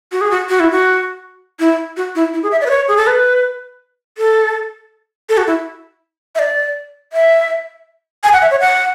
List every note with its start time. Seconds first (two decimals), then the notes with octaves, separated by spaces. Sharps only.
0.12 F#4
0.21 G#4
0.31 F#4
0.49 F#4
0.60 E4
0.71 F#4
1.60 E4
1.97 F#4
2.15 E4
2.33 E4
2.43 G#4
2.52 E5
2.61 D5
2.66 B4
2.70 C#5
2.88 G#4
2.97 A4
3.07 B4
4.18 A4
5.29 A4
5.37 F#4
5.47 E4
6.35 E5
6.39 D5
7.13 E5
8.23 G#5
8.33 F#5
8.42 E5
8.51 C#5
8.60 F#5